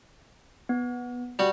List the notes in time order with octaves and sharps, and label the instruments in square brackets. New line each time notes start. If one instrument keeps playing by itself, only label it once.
[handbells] B3
[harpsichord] G3 F#4